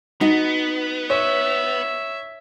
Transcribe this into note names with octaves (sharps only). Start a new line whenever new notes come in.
B3 D#4 F#4
C#5 E5